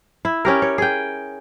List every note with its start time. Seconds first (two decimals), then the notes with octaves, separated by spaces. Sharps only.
0.25 E4
0.45 C#4 G4 A#4
0.62 C#5
0.78 G#4 G5